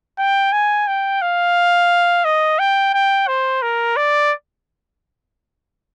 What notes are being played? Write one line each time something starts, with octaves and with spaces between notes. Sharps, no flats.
G5
G#5
G5
F5
D#5
G5
G5
C5
A#4
D5